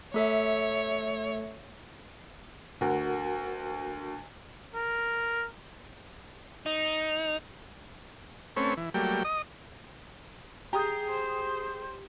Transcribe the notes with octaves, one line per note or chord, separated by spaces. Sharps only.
A3 A4 C#5 E5
D2 F#4 A#4 F#5
A#4
D#4
A3 C4 C#4 B4 C#5
E3
F#3 G3 A3 A#3 G5
D#5 D#6
G4 G#4 A#5 D#6 G6
C5